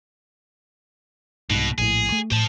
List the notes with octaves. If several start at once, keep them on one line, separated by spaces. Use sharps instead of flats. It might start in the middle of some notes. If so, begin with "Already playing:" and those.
C2 G#2 B2
A#1 A2 G#4
A3
A2 C5 A5